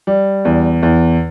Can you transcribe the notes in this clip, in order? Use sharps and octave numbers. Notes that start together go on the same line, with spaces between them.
G3
E2
E2